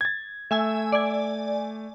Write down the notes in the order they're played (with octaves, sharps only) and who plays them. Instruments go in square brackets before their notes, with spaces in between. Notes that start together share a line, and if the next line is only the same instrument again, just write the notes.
[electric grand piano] G#6 A6
[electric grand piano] A3 [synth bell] E5 G#5 E6
[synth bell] D5 G#5